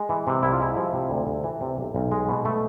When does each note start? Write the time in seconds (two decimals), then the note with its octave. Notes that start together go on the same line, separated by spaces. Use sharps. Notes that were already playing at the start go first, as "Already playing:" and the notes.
Already playing: G#3
0.09 E3
0.27 C3
0.43 C2 E4
0.53 F4
0.60 G#3 E4
0.77 F3
0.93 C3
1.10 D2
1.27 D2
1.44 E3
1.61 C3
1.78 B1
1.94 B1
2.12 G#3
2.29 B2
2.45 A3